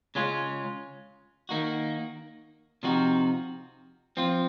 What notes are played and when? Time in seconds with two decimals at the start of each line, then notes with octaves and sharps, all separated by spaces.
0.15 C#3 G#3 C#4 F4
1.49 D#3 A#3 D#4 F#4
2.83 C3 F3 C4 D#4 F#4
4.17 F3 C4 F4